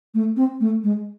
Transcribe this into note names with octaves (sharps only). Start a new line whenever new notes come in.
A3
C4
A3
G#3